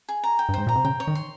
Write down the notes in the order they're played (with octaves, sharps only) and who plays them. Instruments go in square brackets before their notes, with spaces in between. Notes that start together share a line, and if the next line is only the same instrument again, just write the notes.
[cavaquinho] G#4
A#5
G5
[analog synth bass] G2
[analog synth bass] G#2 [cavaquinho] C5
[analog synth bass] A#2 [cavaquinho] A#5
[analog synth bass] C3
[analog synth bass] C#3 [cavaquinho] G5
[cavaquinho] C#5
[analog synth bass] D#3
[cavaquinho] C6